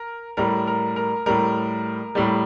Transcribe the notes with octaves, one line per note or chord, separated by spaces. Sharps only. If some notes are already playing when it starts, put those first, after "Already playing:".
Already playing: A#4
A2 G3 A#4
A#4
A#4
A2 G3 A#4
A2 G3